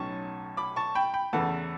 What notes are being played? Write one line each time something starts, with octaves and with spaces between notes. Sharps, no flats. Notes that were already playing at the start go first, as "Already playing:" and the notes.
Already playing: B1 A2 F#3 C#4 A5 C#6
B5 D6
A5 C#6
G5 B5
G5 B5
E2 C#3 E3 A3 F#5 A5